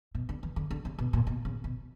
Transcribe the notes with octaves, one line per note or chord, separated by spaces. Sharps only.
B2
D3
E3
D3
D3
C#3
B2
A#2
B2
C#3
B2